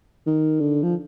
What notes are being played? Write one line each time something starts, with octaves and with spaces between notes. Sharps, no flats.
D#3
D3
F3